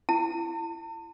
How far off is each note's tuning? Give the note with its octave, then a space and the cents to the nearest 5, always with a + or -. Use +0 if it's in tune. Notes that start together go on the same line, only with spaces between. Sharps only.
E4 +25 A5 +40